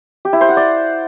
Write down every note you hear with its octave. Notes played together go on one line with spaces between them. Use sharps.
G4
E4
C5
F#5
D5